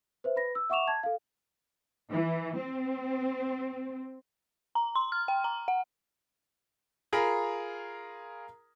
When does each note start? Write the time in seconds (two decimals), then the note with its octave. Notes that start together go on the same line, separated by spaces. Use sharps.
0.24 B4 C5 E5
0.36 B4 B5 A#6
0.55 E6
0.70 E5 F#5 C#6 D6 E7 F7
0.87 A5 G#6
1.03 A4 F5
2.10 E3
2.58 C4
4.75 A#5
4.95 C6
5.12 F6
5.28 G5
5.44 A#5
5.68 F#5
7.13 F4 G#4 A#4 A#5 B5